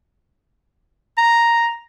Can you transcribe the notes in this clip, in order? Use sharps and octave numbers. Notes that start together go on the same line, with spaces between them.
A#5